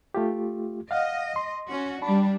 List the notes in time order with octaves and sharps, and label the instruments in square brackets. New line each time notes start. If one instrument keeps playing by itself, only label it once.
[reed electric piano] A3 F4 G4
[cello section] D#5 [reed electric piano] F5 F#5 F6
[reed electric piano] C6
[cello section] C#4 F#4
[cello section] G3 D4 [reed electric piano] A5 B5